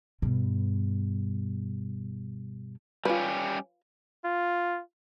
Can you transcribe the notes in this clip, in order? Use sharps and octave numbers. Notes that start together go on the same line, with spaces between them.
G2 B2
G3 C#4 F4 G4 B4
F4